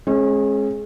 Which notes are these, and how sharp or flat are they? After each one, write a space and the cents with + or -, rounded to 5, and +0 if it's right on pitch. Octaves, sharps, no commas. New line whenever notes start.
G#3 +20 C#4 -35